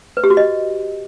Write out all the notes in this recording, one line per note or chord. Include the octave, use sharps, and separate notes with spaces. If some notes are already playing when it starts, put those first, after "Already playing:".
B4
G4
F#4
D#5